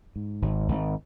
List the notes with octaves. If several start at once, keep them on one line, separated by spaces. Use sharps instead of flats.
G#2
G#1
G#1